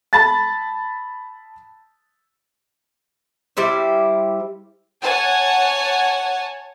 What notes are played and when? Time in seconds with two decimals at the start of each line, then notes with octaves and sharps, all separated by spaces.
0.13 A5 B5 A6
3.57 G3 E4 G4 C5
5.02 C#5 F#5 G#5 A5